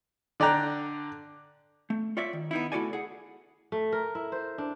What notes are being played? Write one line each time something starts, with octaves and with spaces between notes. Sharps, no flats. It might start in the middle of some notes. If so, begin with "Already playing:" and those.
D3 D5 G5 A#5 F#6
A3
F4 C#5 D5 E5
D#3
B3 D#4 E4
A3 E4 F#4 A4 D5 G#5
G#4 F#5
A3
A#4
E4
C5
D4